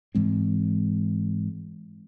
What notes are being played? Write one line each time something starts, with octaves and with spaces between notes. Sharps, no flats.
G#2 E3 G#3 C4